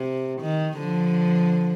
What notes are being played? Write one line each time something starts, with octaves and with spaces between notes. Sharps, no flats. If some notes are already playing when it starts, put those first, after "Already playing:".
Already playing: C3
D#3
D3 F3